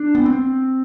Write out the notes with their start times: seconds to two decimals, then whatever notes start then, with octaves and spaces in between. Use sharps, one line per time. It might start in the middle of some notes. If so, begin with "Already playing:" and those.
Already playing: D4
0.15 B3
0.26 C4